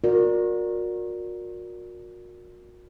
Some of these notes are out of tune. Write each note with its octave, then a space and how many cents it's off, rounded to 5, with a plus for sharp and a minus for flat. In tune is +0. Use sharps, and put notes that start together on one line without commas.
F#4 -40 A#4 +0 D5 +0